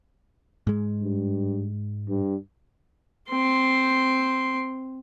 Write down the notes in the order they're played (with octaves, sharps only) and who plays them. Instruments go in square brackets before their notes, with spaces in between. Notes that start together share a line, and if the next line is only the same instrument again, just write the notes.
[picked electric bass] G#2 G#3
[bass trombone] G2
G2
[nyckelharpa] C4 C6